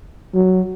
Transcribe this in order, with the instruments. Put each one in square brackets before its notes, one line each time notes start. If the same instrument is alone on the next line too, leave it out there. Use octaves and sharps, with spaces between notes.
[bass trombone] F#3